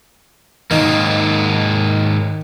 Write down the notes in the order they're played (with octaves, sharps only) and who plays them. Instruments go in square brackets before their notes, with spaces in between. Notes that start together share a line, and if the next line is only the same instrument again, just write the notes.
[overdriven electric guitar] G#2 A#3 [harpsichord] D#3